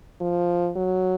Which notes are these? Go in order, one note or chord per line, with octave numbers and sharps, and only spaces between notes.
F3
F#3